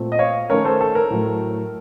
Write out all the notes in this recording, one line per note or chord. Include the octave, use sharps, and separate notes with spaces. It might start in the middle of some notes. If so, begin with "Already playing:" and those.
Already playing: A#2 A3 C4
D#5
C#5 F5
D#3 A3 C#4 A#4 C#5
A4 C5
A4
A#4
A2 F#3 A3